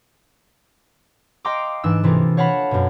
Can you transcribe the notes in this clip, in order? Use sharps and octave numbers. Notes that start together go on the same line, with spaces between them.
D#5 F5 G5 A#5 C6 D6
G#2 E3 D4 E6 F#6
C3 E3 A#3 F4 G#4 A4
C#5 F5 F#5 A5 B5
F#2 B2